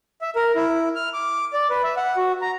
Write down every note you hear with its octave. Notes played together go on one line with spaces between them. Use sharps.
E5
A#4
E4
F6
D6
D5
B4
E5
F#5
F#4
A#5